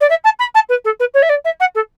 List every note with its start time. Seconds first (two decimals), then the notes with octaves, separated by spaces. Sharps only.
0.01 D5
0.10 E5
0.24 A5
0.39 B5
0.54 A5
0.69 B4
0.84 A4
1.00 B4
1.14 C#5
1.22 E5
1.29 D5
1.45 E5
1.60 F#5
1.75 A4